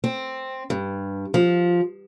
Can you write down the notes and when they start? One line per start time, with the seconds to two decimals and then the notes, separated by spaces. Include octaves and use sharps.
0.04 C4
0.70 G2
1.34 F3